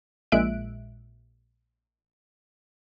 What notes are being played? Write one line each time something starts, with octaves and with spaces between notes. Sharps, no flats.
A#1 A#2 G#3 E5 F#6 D7